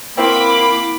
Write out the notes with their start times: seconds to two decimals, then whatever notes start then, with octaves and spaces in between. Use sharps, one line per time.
0.17 A#3 C4 E4 F#4 B5 D6